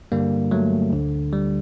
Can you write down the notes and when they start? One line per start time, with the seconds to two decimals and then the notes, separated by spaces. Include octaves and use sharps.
0.12 G2 D3 G3 A#3
0.51 F#3 A3
0.93 D2 D3
1.32 G3